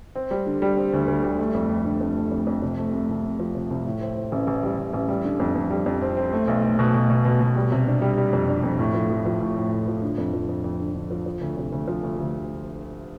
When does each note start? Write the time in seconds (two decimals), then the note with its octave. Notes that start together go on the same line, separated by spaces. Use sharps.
0.15 C4
0.31 G3
0.46 D3
0.62 G3
0.77 C4
0.93 D2
1.08 D2
1.24 G3
1.39 A3
1.54 F2
1.70 F2
1.85 D3
2.01 F2
2.16 A3
2.32 F2
2.47 F2
2.62 C3
2.78 A3
2.93 C2
3.09 C2
3.24 C2
3.39 F3
3.55 C3
3.70 C2
3.86 A2
4.01 C4
4.16 C4
4.32 A1
4.47 A1
4.63 G3
4.78 A1
4.93 A1
5.09 G3
5.24 D3
5.40 F2
5.55 F2
5.70 G3
5.86 F2
6.02 C4
6.17 C4
6.33 A3
6.48 B1
6.63 A3
6.79 B2
6.94 B2
7.10 B2
7.25 B2
7.41 B2
7.56 G3
7.72 C3
7.87 D4
8.02 G3
8.18 G3
8.33 F2
8.48 D4
8.63 F2
8.79 A2
8.94 F3
9.10 F3
9.26 F3
9.41 A2
9.56 A2
9.72 A2
9.87 F3
10.02 D3
10.18 F2
10.33 F3
10.49 F2
10.64 F2
10.80 D3
10.95 D3
11.11 F3
11.26 F3
11.41 D2
11.57 C3
11.72 D2
11.88 F3
12.03 D2
12.18 D2